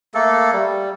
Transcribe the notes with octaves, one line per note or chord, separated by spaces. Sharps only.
A3 A#3 A4
G3